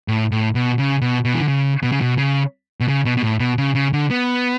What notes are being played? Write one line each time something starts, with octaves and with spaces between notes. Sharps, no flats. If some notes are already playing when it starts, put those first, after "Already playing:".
A2
A2
B2
C#3
B2
B2
E3
D3
C#3
B2
C#3
B2
C#3
B2
C#3
B2
B2
A2
B2
C#3
C#3
D3
B3